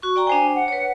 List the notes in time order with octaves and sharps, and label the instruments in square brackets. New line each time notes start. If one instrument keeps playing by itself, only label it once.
[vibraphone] F#4 C#6
D5 G5 A#5
[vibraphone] D4 C5 G5 [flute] G#5
[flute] F#5
[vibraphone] B4 C#5